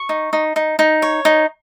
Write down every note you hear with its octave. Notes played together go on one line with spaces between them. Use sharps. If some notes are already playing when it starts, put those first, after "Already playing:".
Already playing: C#6
D#4
D#4
D#4
D#4
C#5
D#4